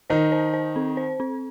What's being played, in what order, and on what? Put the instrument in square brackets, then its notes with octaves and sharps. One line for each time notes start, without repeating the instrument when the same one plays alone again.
[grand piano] D#3 D#4 [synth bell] C5
[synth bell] C5
C5
C4
C5
C4